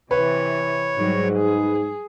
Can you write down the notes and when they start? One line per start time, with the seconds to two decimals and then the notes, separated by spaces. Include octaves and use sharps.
0.11 C3 E3 B4 C#5
0.98 G#2 F#3 G3
1.37 G#4